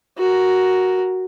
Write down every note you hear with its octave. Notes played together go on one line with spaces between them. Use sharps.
F#4 A#4